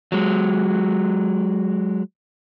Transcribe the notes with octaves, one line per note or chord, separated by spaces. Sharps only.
F#3 G#3